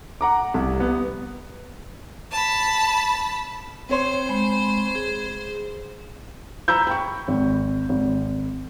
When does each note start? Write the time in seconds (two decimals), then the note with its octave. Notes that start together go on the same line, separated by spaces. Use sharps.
0.21 F#5 A#5 D6
0.54 C2
0.80 B3
2.31 A5 B5
3.89 C4 C5 C#5 C6
4.29 G#3 B5
4.95 G#4
6.68 A#5 B5 E6 G6
6.87 G5 B5 C#6
7.28 G#1
7.89 G#1